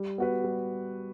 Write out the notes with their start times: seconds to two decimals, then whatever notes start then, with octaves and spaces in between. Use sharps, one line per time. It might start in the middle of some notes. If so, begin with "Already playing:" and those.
Already playing: G3
0.18 B3 F#4 B4
0.44 G3